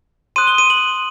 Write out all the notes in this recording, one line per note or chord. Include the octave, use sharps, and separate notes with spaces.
C6 D#6 F#6 D#7
G7
D#7
F#7